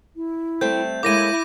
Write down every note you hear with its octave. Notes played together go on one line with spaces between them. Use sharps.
E4
G3 A3 C4 G6
G#3 A#3 E4 C#5 D6 A#6 D#7